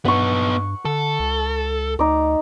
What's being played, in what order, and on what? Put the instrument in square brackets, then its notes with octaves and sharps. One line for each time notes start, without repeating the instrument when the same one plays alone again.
[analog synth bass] G2 [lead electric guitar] B3 D#4 [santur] F#5 C#6
[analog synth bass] D3 [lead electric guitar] A4
[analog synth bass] C#2
[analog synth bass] D2 [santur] D#4 D6